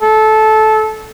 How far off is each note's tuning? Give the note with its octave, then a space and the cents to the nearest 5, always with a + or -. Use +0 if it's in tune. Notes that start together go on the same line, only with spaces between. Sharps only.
A4 -20